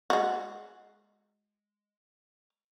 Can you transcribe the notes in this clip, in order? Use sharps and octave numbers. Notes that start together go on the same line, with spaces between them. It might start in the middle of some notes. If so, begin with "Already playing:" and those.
G#3 F#4